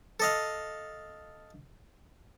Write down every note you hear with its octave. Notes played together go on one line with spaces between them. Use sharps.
A4 D#5 F5